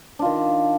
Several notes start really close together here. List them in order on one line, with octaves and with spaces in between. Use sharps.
D4 F4 D#3